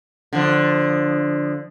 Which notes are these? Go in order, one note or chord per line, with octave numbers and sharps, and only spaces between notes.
D3 F3